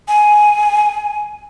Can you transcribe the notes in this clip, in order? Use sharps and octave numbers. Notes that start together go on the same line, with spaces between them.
G#5